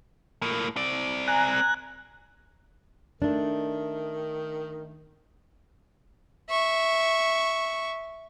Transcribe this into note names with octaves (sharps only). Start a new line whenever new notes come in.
A2 A#3
C4 D5
G#5 A#5 F#6
D#3 A3 D4
E5 C#6